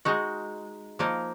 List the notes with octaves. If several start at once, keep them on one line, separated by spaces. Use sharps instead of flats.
G#3 D#4 F#4
F3 A#3 D#4 A#4